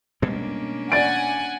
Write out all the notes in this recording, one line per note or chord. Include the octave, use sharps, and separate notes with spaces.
B2 G3 G#3 A#3 C#4 D4
D5 F#5 G#5 A6 D7